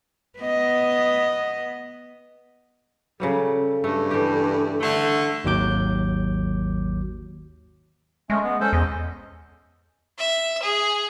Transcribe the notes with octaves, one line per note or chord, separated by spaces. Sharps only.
B3 D#5
C#3 F#3 G3 A4
G2 A3
E3 G4
D3 A3
G#1 D#2 F#3 D6 G6
G#3 A3 C#4
B3
C#4 A4 C5
E2 D#5
E5
G#4